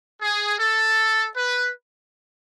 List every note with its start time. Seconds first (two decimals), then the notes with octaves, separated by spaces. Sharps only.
0.22 G#4
0.59 A4
1.35 B4